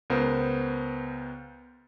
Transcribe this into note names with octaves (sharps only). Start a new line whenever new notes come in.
C#2 B3 A#4 C5